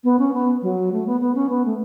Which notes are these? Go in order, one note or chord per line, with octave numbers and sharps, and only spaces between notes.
B3
C#4
B3
F#3
A3
B3
B3
C#4
B3
A3